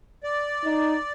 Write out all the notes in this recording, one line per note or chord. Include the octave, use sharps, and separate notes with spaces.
D5
D#4